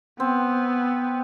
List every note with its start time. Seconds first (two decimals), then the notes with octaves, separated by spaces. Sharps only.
0.20 B3 C4